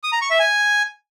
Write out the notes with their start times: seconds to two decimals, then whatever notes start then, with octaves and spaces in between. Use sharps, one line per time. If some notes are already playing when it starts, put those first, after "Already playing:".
0.04 D#6
0.13 A#5
0.22 C#6
0.30 E5
0.39 G#5